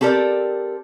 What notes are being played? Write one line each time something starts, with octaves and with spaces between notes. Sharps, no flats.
C4 G4 A4 A#4 D5